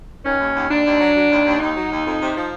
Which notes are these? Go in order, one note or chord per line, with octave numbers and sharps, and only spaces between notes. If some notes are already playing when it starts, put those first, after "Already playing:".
D#3 C#4
D#2
D#2
D#2 D4
D#2
F#3
F#3
D#2
D#2
D#2 D#4
F#3
D#2
F2
C3
F3